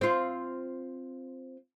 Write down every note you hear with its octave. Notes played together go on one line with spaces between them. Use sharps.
C4 F4